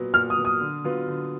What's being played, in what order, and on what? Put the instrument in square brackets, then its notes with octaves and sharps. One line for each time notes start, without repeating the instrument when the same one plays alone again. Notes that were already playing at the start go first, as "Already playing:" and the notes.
Already playing: [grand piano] A#2 F#3 B3
[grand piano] A#2 [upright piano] F6
[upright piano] D#6
[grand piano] F#3 B3
[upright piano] D#6
[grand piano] D3
F#3 B3 F4
D3